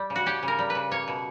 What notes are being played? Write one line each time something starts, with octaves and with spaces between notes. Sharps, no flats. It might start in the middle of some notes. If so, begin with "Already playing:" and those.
Already playing: G3
C#3
F#4
C#4 G4
C#3
A#4
G3
B4
C#3
A#3 C#5
B2